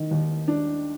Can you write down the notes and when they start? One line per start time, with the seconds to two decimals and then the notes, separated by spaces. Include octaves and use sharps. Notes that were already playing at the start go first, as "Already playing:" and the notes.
Already playing: D#3
0.11 D#2
0.48 D4